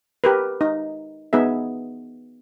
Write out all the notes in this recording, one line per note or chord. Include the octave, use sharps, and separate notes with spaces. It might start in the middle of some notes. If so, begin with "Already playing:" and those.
G4 A#4 B4
D#4
B3 D#4 G#4 E5